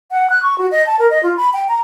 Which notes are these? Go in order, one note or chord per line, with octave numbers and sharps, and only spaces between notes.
F#5
F#6
C#6
F#4
D#5
A5
A#4
D#5
F4
B5
G5
A#5